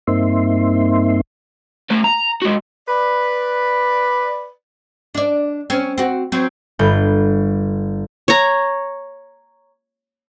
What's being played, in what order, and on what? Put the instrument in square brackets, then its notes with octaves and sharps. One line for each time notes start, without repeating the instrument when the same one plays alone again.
[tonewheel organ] G2 A#3 C4 D#4 E5 C6
[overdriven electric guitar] A3 B4
A#5
G#3 F#4
[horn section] B4 D5
[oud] D4 D5
C4 C#4
C4 F#4
F#3 C4
[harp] G1 G6
[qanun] C#5 A#5